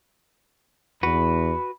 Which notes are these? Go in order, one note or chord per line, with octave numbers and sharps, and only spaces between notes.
E2 F#4 B4 B5